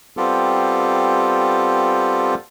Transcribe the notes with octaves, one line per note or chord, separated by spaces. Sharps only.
G3 B3 C4 F4 G4 A4